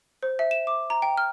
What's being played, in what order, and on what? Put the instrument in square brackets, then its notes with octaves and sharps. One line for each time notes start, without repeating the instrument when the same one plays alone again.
[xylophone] C5
E5
E7
D6
A#5
G5
F6